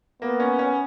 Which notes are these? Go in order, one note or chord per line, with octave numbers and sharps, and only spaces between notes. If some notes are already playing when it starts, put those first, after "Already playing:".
A#3 B3
C#4
C#4